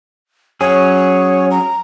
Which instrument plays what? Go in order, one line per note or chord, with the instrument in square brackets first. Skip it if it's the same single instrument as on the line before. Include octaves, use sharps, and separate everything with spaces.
[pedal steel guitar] F#3 C#4 G#4 [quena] C#5
[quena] A#5